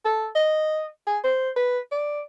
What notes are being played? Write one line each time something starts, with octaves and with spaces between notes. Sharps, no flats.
A4
D#5
G#4
C5
B4
D5